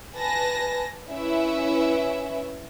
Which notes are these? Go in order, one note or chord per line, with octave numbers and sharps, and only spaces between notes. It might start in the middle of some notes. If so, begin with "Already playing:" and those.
B4 G#5 A5 A#6
C#4 E4 B4 E5